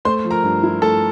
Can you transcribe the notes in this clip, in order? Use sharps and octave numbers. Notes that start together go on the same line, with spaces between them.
A3 C5 C6
F3
A#4 A#5
G2
E4
A3 A4 A5